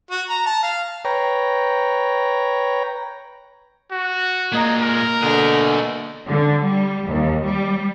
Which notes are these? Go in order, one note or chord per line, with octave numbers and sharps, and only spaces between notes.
F#4
A#5
A5
F5
B4 C#5 G5 A#5
F#4
A#2 G#3 A#3 D#5 A#5
A#4
B2 D3 A3 G#4 F#6
D3
G3
D#2
G3